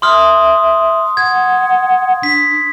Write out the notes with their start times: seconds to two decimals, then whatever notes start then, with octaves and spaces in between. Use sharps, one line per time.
0.02 E5 C6 D#6 F6
1.17 F#5 G#6
2.23 D4 B6